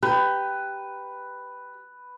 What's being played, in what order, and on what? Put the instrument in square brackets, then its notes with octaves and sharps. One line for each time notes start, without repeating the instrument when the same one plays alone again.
[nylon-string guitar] G4 [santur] B4